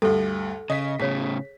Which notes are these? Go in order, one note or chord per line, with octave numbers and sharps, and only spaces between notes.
D2 G2 A4
C#3 D#5 B6
A2 C#3 G#4 C#5 B6